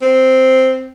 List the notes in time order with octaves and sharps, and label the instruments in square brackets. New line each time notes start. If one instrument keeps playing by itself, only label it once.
[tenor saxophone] C4